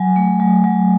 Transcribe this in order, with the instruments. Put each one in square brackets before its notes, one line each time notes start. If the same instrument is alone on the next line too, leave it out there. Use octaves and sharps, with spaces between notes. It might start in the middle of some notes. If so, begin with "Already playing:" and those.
Already playing: [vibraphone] F#3 G#5
A3
F#3
F#3